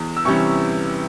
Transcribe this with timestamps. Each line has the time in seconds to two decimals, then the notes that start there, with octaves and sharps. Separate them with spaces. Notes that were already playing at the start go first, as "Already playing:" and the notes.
Already playing: E2
0.17 E6
0.25 C3 E3 G3 C#4 C#6